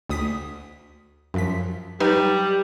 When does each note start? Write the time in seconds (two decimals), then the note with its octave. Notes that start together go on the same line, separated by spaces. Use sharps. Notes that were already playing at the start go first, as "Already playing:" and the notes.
0.10 D2 D#6 B6
1.34 F#2 F3 B6
2.00 F#3 G3 D#4 B4